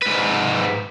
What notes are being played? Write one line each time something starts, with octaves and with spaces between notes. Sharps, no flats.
G#2 B4